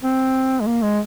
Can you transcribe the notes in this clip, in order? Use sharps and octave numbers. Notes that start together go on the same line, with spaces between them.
C4
G#3
A#3
G#3